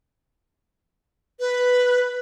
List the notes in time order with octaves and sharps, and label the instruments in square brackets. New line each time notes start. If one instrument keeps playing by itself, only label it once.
[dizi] B4